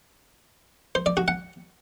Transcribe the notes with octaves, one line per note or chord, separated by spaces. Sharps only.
C5
D5
F#4
F#5